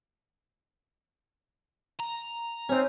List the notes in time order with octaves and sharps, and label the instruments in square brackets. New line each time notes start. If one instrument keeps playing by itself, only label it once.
[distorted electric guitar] A#5
[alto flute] C4 [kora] C#4 D#4